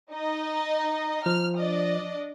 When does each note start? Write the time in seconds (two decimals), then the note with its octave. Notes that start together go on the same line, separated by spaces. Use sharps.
0.10 D#4 D#5
1.26 F3 F6
1.57 D4 D5 D#5